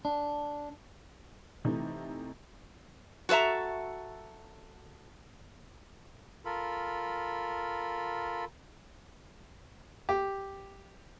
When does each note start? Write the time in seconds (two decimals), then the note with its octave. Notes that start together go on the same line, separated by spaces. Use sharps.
0.05 D4
1.65 C3 E3 A3 D#4
3.29 F#4 A4 B4 E5 A#5
6.45 F4 A4 A#4 B5
10.09 G4